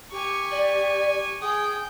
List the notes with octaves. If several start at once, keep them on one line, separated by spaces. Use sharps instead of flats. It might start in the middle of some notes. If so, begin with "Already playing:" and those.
G4 G#5 C#6
D5
G#4 G5 D#6